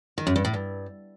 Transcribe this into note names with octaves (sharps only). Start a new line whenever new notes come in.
D#3
F#2
G2
A2
G2